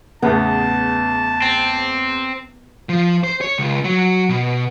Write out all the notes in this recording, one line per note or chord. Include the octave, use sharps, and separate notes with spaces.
E2 A2 C#3 B3 A5
C4
F3
C5
C#5
C#2
F#3
B2